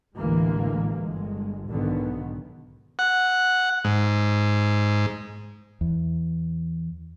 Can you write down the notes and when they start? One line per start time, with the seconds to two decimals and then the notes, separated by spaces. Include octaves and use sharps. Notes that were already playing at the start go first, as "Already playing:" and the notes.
0.15 A1 D2 D3 E3 G#3 A#3
0.99 G1 G#3
1.68 B1 G#2 D3 D#3 B3
2.99 F#5
3.85 G#2
5.81 E2